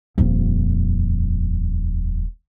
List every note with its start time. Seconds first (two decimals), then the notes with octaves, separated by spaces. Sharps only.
0.18 D#1 F2